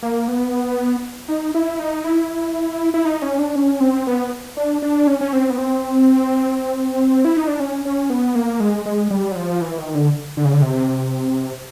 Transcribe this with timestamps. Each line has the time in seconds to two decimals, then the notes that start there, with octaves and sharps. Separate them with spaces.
0.03 A#3
0.28 B3
1.28 D#4
1.55 E4
1.79 D#4
2.04 E4
2.94 E4
3.05 D#4
3.22 C#4
3.39 D4
3.56 C#4
3.80 C4
4.07 B3
4.57 D4
4.82 D4
5.07 C#4
5.21 C#4
5.33 C4
5.50 B3
5.58 C4
7.25 E4
7.37 D#4
7.48 D4
7.60 C#4
7.85 C#4
8.10 B3
8.35 A#3
8.60 G#3
8.85 G#3
9.11 G3
9.31 F#3
9.36 F3
9.61 E3
9.78 D#3
9.95 D3
10.37 D3
10.45 C#3
10.53 D3
10.62 C3